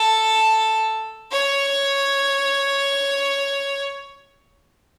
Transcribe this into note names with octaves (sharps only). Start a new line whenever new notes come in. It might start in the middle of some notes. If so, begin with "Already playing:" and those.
Already playing: A4
C#5